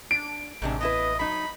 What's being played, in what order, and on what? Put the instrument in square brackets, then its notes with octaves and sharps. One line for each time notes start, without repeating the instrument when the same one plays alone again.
[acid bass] D4 [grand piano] D7
[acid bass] A1 [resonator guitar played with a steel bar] G#2 C3 D4
[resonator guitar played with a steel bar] B3 E4 B4 [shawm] D#5
[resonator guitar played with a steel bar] F#3 D#4 [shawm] B5